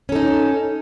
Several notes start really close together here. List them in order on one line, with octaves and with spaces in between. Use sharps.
C#4 A4 D#4